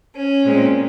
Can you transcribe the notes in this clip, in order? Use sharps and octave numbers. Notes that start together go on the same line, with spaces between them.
C#4
A#2 G#3 C4